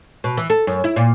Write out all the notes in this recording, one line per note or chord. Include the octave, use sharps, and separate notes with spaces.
B2
E3
A4
F#2
E4
A#2